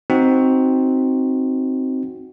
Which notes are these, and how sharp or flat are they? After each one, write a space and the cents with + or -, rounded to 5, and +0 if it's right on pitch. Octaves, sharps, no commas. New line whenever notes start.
C4 +0 D#4 +0 F#4 +0